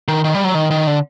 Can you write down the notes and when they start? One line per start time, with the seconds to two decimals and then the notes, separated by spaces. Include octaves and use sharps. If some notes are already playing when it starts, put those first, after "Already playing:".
0.08 D#3
0.24 D#3
0.35 G3
0.44 F#3
0.55 D#3
0.71 D#3
0.87 D3